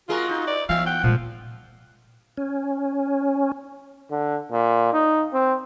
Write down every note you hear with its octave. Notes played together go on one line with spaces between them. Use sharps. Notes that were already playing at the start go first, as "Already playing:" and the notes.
G#3 F4 F#4 G#4 A#4
D#4
D5
E3 B3 E5 F5
F#5 G5
A#2 F3 G#3
C#4
D3
A#2
D#4
C4